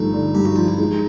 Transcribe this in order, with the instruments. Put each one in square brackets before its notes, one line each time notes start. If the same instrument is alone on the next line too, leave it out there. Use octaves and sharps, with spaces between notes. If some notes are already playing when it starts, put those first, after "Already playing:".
Already playing: [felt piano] G2 D3 F3 A3 [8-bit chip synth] D#4
[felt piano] D3
[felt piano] G2 [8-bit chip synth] G4
[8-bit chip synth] F#4
[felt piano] F3 [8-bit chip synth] F4
[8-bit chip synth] E4
[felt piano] G#3 [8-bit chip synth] D#4